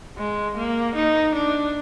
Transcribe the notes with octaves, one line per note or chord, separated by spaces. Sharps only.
G#3
A#3
D#4
D4